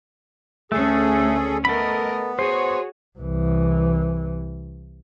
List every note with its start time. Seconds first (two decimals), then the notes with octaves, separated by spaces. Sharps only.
0.72 D2 A3 C#4 G#4 A4
1.65 A3 B3 A4 A#4 D#5 B5
2.39 F#4 G#4 C5 C#5
3.19 C2 E3